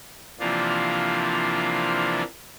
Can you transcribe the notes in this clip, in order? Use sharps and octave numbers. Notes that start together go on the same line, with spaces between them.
C3 E3 F3 A#3 D4 F4